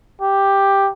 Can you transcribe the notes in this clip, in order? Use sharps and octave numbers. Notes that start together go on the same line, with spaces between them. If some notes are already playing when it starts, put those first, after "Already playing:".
G4